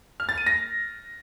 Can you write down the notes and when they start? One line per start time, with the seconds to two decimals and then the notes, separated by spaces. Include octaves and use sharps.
0.20 F6
0.29 A6
0.38 D#7
0.47 A#6